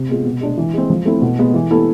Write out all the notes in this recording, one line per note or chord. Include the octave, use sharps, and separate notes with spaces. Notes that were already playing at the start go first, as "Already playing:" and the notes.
Already playing: C3
G#3 B3 F4 G#4
B2
G#3 D4 G#4
E3
G#3 C4
F3
A3 C4 E4
B2
G#3 B3
E3
B3 E4 A4